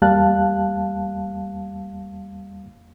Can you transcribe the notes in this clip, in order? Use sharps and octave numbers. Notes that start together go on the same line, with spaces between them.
E2 G3 A#3 F5 A5 F#6